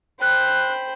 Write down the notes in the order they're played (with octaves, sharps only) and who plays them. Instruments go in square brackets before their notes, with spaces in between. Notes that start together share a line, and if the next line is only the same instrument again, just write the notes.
[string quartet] C5 G5 B5 [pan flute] F#6